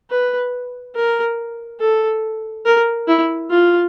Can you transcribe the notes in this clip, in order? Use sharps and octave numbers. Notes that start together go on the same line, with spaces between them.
B4
A#4
A4
A#4
E4
F4